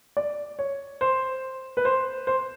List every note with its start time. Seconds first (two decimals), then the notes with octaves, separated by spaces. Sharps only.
0.17 D5
0.59 C#5
1.01 C5
1.77 B4
1.85 C5
2.27 C5